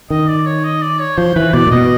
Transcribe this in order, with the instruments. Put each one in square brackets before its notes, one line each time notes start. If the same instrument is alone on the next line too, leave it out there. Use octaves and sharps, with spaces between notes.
[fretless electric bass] D#3 [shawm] D#5
[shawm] D5
C#5
D#5
D5
C#5
[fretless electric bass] F3 [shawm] C5
[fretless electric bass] E3 [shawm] B4
[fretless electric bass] B2 [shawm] D5
[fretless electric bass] A#2
[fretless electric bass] B2 [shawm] D#5